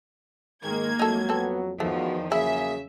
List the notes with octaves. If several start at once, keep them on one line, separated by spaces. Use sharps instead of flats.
G#2 D#3 G#3 A#3 G#4 G#6
F2 F#3 A3 D#4 A4
B3 C4 A4
E2 D#3 F3 A3 B3 F#4
C#3 F#3 A#3 E4 G#4 E5